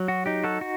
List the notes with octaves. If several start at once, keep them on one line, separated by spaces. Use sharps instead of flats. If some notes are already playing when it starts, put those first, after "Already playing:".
Already playing: F#3
F#4
D#4 G4
F#4 A4
F#4